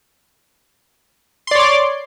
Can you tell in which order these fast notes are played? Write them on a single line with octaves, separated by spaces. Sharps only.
C6 D5 C#5 D6